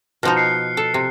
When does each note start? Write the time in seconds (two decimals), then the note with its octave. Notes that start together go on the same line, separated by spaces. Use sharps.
0.23 B2 F3 D#4 F6
0.36 F#6 C7 C#7
0.77 A4
0.94 C3